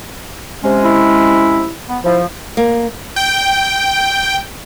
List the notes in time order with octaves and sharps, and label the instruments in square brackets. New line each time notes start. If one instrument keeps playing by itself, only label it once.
[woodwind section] C3 G#3 C#4
[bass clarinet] E4
B3
[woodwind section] F3 [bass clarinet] E4
[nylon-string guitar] A#3
[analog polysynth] G5